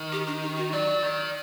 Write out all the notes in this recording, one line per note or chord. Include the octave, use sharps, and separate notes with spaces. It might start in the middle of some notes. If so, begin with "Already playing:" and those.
Already playing: D#3
G4
D4
D#4
F#4
F#3 D5
D#3